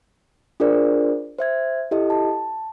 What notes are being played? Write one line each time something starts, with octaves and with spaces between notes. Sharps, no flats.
D4 F4 G#4 A#4 C5 D5
C5 E5 G#6
E4 G4 A4 D#5
A5